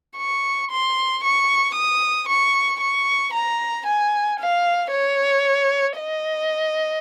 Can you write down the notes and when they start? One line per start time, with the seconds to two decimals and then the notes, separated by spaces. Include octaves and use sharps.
0.17 C#6
0.71 C6
1.23 C#6
1.75 D#6
2.28 C#6
2.81 C#6
3.33 A#5
3.86 G#5
4.39 F5
4.91 C#5
5.97 D#5